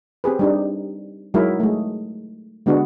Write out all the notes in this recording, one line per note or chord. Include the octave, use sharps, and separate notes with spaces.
C4 G4 G#4 B4
G3 D4 D#4
F#3 G#3 D#4 E4 A#4
G#3 A3
D3 G#3 B3 D4 F#4